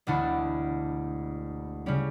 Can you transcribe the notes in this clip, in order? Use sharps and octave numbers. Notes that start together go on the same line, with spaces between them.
E1 D2 D3 A3 E4
C#3 G3 C#4